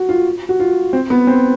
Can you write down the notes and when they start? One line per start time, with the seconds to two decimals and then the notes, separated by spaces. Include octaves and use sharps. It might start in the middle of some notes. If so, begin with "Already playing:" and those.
Already playing: F#4
0.09 F4
0.49 F#4
0.60 F4
0.93 C4
1.10 B3
1.27 C4